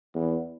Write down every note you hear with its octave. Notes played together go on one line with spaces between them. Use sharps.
E2